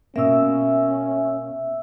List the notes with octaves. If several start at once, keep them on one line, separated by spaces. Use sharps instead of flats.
B2 A#3 C#4 E5 E6